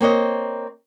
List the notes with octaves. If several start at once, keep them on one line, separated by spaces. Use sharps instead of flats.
A#3 C4 C#5 D#5